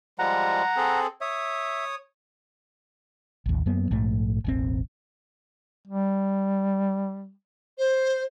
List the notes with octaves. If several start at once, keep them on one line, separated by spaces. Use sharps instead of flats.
F3 G3 G#3 F#5 A#5
C4 G#4 A4
C#5 E5 D#6
A1 D#2
F#2 F#3 A#3 B3
A#1 G#2 A3
E1 A1 C4
G3
C5